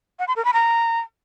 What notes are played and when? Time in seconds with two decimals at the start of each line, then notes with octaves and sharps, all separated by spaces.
0.19 F#5
0.28 C6
0.36 A#4
0.45 B5
0.53 A#5